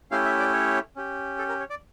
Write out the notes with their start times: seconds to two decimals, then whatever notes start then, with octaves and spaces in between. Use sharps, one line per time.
0.11 A3 C#4 E4 G4 F5
0.25 E5
0.39 D5
0.53 C#5
0.96 C#4 G4
1.38 A4
1.49 A#4
1.60 C#5
1.70 D5